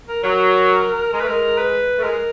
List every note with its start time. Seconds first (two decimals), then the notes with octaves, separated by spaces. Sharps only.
0.08 A#4
0.23 F#3 A#4
1.13 G#3 A#4
1.20 A3 B4
1.28 G#3 A#4
1.58 B4
1.98 A3
2.02 G#3 A#4